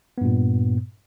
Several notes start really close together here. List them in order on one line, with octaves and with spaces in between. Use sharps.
B3 G2 A#2